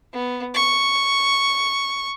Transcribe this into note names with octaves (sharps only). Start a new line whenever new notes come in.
B3
C#6